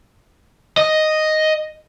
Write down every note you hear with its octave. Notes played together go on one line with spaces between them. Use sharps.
D#5